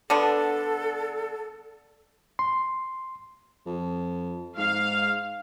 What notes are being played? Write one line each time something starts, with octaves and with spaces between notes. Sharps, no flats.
D3 B3 D4 A4
C6
F2
G#2 F5